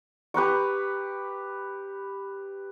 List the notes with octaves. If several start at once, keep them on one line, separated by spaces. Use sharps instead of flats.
G4 B4 A#5 C#6